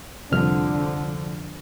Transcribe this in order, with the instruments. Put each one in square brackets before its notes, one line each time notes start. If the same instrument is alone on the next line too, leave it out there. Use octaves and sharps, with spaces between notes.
[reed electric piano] C2 F2 F6 [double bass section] D3 F3